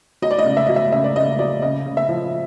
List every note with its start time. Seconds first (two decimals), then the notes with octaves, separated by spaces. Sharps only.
0.22 F#3 D#5
0.31 D5
0.38 D#5
0.45 C#3
0.57 E5
0.67 F#3 D#5
0.76 E5
0.92 C#3 E5
1.04 D5
1.15 C#3 D#5
1.39 F#3 D5
1.62 C#3 D#5
1.86 C#3
1.97 E5
2.09 F3